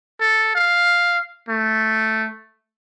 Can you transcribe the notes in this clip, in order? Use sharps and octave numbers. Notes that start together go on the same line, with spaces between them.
A4
F5
A3